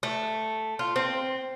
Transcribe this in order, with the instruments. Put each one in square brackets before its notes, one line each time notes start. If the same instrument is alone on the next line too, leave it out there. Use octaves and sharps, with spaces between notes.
[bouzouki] A3
F4
C4